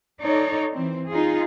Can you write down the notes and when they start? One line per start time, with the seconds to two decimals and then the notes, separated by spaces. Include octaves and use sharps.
0.21 D#4 A4 C#5 D5
0.72 E3 C4
1.10 D#4 F4 G#4